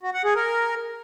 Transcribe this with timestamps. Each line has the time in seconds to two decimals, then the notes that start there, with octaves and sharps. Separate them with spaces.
0.03 F#4
0.14 F#5
0.25 G#4
0.35 A#4